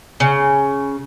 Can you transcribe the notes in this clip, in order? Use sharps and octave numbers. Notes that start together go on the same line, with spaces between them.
C#3